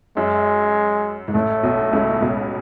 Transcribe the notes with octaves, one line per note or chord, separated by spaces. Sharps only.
F#2 G#3
G#2
A1 A2 A3
B1 B2
C#2 C#3
B1 B2